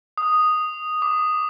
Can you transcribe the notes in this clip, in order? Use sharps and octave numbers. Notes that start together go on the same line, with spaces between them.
D#6
D6